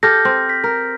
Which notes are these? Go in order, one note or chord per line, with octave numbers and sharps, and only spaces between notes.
G4 A4 F6 G6 A#6
C4
B6
A#4